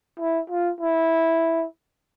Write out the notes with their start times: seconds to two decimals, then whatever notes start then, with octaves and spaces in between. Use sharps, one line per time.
0.20 E4
0.50 F4
0.81 E4